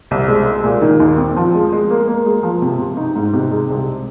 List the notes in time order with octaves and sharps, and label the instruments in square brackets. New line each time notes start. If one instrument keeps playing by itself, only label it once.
[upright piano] C2
G#3
G#3
A#2
D#3
D#2
C4
F3
G#3
G#3
A#3
A#3
G#3
F3
C3
C3
D#4
G#2
C3
G#3
C2